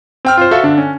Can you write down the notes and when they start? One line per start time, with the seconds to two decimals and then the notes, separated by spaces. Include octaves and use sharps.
0.25 C4 G5 F6
0.38 F4 C5
0.51 F#4 A4 E5 F5
0.63 D3 D4
0.78 C#4